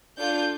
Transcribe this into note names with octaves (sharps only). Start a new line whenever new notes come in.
D4 F4 A4 G6